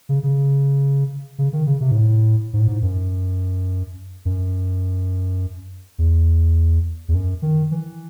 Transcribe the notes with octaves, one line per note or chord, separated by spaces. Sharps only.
C#3
C#3
C#3
D#3
C#3
C3
G#2
A2
G#2
A2
G#2
F#2
F#2
E2
E2
F#2
D#3
E3